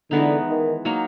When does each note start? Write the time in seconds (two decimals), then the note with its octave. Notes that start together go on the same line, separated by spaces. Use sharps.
0.11 D3 E3 G#3 B3 D#4
0.48 D#3
0.85 F#3 A#3 D#4